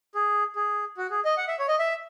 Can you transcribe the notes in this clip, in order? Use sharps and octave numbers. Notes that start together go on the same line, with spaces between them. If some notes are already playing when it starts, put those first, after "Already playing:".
G#4
G#4
F#4
G#4
D#5
F#5
E5
C#5
D#5
E5